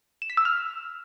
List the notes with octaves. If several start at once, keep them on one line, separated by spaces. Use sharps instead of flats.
E7
B6
E6
F6